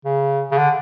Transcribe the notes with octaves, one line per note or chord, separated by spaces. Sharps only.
C#3
C#3
D3